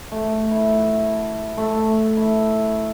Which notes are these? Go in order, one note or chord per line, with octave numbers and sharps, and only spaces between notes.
A3
E4
F#4
A3
E4